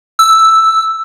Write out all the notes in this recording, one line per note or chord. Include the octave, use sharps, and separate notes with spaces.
E6